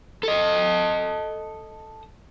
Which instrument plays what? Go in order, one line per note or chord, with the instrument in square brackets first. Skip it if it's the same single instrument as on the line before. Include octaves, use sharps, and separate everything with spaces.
[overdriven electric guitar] A4 D#5